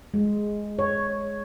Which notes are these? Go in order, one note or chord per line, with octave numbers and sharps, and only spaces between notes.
G#3
C#5